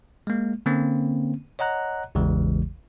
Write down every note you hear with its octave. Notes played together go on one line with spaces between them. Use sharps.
G#3 A#3
D3 A#3 C4 C#4
C#5 D#5 F#5 A#5 F#6
A1 E2 C#3 E3 G#3